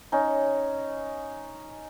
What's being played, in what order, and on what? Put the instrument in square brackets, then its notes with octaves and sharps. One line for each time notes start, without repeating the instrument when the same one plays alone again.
[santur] C#4 D#4